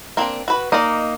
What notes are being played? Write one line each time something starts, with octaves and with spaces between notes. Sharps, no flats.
A#3 C4 D4
F#4 B4
A#3 D#4 D5 D#5